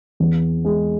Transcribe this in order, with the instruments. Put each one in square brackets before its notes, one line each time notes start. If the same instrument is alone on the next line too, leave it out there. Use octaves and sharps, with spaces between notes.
[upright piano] E2
G#3